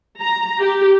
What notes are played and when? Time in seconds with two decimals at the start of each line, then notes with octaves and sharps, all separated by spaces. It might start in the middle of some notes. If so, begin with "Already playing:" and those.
0.19 A#5
0.60 G4